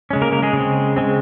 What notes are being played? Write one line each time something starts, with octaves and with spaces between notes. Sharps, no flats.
C#3 G#3 C#4
A#3 A#4
A#3 A#4
G#3 G#4
C#3 G#3 C4
C#3 G#3 C4